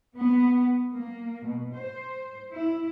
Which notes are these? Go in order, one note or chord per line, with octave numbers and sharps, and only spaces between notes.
B3
A#3
B2
C5
E4